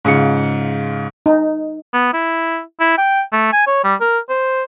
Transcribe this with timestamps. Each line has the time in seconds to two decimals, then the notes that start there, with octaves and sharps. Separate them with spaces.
0.05 G#2 C#3 F4 C#7
1.26 D#4
1.93 B3
2.13 E4
2.80 E4
2.98 G5
3.33 A3
3.53 G#5
3.67 C#5
3.84 G3
4.01 A#4
4.29 C5